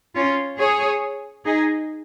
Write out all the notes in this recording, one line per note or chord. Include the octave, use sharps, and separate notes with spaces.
C#4 F4
G#4 C#5
D#4 G#4